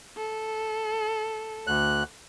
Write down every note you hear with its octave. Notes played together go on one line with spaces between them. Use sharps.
A4
D2 F#6